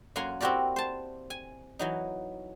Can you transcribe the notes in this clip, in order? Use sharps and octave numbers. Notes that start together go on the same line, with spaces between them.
F#2 A#3 F#5 G#5 A#5 C6
C4 E4 F#4 G4 A#4 D5
C5 A5
G#5
E3 F#3 D#4